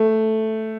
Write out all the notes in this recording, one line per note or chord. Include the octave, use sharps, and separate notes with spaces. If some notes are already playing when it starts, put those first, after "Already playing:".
Already playing: A3